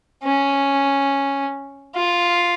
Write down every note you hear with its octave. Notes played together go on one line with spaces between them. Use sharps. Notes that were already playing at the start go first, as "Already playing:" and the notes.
C#4
F4